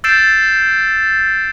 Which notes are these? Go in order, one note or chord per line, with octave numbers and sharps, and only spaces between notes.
E6 G6 A6 C7 D7 E7